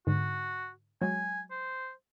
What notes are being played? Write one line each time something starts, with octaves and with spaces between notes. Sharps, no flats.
G#2 D3 F#4
F#3 G#3 G#5
C5